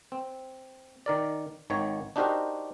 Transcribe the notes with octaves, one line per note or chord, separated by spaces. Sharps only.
C4
D#3 A#4 D5
G#1 D#3 C#5
D4 D#4 F#4 G4 A#4 C5